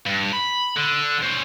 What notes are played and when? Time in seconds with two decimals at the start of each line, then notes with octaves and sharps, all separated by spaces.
0.06 G2
0.32 B5
0.77 D3
1.23 C#4 C5